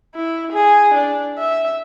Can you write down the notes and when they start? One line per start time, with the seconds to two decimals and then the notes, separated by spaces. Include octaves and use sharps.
0.15 E4
0.52 G#4
0.94 D4
1.39 E5